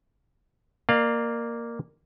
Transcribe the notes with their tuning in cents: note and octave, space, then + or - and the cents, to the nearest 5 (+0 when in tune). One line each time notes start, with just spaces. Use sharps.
A#3 +0 D5 +40 F5 +0